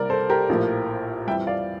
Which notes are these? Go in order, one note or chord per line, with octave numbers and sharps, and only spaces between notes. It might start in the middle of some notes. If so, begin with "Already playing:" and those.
Already playing: C2 C3 G3 A#3 A#4 D5
A4 C5
G4 A#4
A#1 A2 F3 A#3
F2 E3 G3 E5 G5
D5 F5